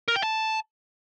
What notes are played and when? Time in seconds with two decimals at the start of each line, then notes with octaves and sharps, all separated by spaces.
0.08 A#4
0.16 G5
0.23 A5